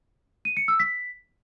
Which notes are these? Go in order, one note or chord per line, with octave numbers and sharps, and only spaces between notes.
D#7
C#7
E6
B6